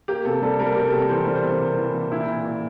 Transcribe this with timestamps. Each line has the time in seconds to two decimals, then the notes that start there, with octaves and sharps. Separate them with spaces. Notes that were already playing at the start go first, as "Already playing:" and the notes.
0.08 A#3 G4
0.25 C3 A4
0.42 G3 A4
0.59 G3 A#4
0.76 C3 G4
0.88 C3 A4
0.99 A#4
1.09 E3 C5
1.26 G3
1.35 C5
1.44 C3
1.61 A#3
1.78 E3
1.95 E3
2.11 A#2 E4
2.28 A#2
2.45 A#2